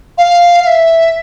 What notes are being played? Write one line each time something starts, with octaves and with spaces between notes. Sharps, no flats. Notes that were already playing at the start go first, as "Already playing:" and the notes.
F5
F5
E5